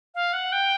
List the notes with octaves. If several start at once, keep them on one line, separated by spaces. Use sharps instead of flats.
F5
F#5
G5